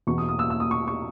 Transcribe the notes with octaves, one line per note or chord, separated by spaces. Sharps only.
E2 B2 C#6
D#6
D#6
E6
E6
D#6
C#6
C#6